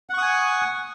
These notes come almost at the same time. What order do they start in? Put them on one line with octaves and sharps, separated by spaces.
F#5 C#6 D#6 G#5